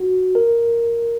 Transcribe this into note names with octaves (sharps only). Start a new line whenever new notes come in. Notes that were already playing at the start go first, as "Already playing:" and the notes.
Already playing: F#4
A#4